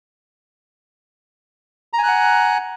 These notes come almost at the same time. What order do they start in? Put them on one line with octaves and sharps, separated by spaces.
A#5 G#5 F#6 F#5